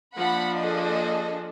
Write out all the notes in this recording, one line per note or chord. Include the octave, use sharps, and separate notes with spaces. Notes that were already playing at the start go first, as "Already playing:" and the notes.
F3 A#3 D4 F#5 B5
G#4 A4 D#5